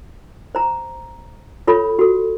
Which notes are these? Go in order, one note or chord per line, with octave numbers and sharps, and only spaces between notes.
C5 A#5
F4 A4 C#5 B5
F#4 A4